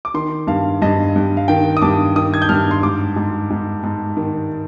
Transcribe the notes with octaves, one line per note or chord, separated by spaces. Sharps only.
D6
D#3 C6
G2 F5
G2 D#5
G2
F5
D#3 G5
D#6
G2 D6
D#3 D#6
G#6
G6
G2 F6
C6
G#2 D6
G#2
G#2
G#2
D#3